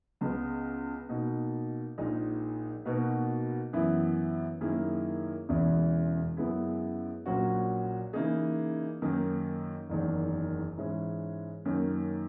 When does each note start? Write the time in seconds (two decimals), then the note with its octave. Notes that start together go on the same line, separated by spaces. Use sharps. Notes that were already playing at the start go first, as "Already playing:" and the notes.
0.21 C#2 C#3 G#3 B3
1.09 B2 A#3 D#4
1.98 A#1 A#2 G#3 D#4
2.85 B2 A#3 D#4 F#4 B4
3.73 F#2 E3 B3 E4
4.61 F#2 D#3 A#3 E4 G#4
5.49 E1 E2 C#3 E3
6.37 F#2 C#3 G#3 B3 E4
7.26 A#1 A#2 F#3 C#4 F#4
8.13 C#3 E3 A#3 D#4 G#4
9.02 F#2 D#3 A#3 D#4
9.89 F#1 E2 D#3 G#3
10.78 G#2 E3 G#3 C#4 G#4
11.65 F#2 D#3 A#3 C#4